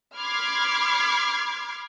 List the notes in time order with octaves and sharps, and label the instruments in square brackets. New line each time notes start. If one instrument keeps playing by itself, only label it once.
[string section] B5 C6 D6 F6 G#6 C7